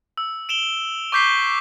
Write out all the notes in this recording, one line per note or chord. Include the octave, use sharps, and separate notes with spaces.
E6
D7 E7 F7 G7
C#6 D6 G6 B6 C7 G7